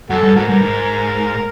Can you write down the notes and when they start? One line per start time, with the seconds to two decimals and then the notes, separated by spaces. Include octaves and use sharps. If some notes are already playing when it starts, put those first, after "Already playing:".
0.10 F#2 F#4 A4
0.23 G2
0.36 G#2 F#4 A#4
0.49 G2
0.62 G#2